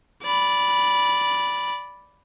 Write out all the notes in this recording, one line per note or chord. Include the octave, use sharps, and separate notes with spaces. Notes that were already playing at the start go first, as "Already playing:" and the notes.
D5 B5